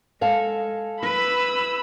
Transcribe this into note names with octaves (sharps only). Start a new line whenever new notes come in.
G#3 A4 F5 G#5
E4 B4 B5 E6